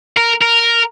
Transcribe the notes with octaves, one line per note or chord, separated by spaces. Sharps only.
A#4
A#4